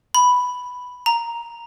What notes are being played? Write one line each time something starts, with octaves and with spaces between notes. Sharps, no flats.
B5
A#5